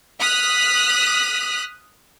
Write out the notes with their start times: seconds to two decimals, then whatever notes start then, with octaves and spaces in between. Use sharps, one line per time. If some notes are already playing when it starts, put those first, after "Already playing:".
0.21 D#6 F6 F#6 B6